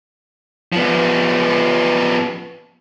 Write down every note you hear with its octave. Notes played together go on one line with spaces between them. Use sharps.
F3 B3